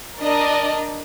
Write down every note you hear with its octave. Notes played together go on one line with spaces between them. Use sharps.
D4 A#4 D5 D#5